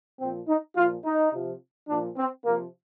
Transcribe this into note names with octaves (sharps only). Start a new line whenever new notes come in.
A#2 F3 C4
D#4
A#2 F3 F4
D#4
C3 F3
A#2 F3 D4
C4
C3 F3 A#3